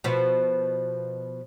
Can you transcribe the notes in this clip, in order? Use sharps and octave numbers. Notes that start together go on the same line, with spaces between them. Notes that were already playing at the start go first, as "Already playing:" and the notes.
B2 F3